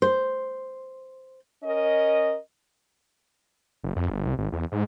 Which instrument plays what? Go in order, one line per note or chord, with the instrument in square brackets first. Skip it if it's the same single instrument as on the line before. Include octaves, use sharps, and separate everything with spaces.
[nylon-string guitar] C5
[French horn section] C#4 A#4 D#5
[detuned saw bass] F#1
F2
G1
C2
G#1
E2
G#2